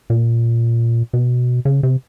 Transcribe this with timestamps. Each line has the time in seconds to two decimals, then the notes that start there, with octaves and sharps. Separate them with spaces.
0.10 A#2
1.13 B2
1.65 C#3
1.83 C3